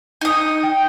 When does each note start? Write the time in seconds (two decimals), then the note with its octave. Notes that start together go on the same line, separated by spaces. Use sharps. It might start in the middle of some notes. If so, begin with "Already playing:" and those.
0.21 D#4 D#6
0.63 G5